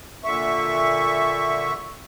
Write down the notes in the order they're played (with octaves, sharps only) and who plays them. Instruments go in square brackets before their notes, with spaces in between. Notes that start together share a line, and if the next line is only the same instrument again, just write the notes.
[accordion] A#2 D3 E5 C#6